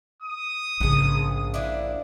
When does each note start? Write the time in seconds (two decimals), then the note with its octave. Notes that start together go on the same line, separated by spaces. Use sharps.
0.22 D#6
0.80 A#1 G#2 C#3 B3 G#4
1.54 D4 E4 D5